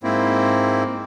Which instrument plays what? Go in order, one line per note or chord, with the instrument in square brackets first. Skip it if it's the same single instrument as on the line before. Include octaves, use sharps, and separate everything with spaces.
[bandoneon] G#2 A#3 C4 E4